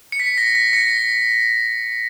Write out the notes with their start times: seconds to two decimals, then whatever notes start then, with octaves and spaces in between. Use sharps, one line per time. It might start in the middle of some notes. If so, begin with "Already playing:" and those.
0.12 C#7
0.20 B6
0.38 A#6
0.55 B6
0.73 A#6 C#7